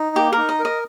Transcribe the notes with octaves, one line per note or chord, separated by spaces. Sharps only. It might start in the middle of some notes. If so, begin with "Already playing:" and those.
Already playing: D#4
A#3 G4
A#4
D#4
D#5
A#4
D#5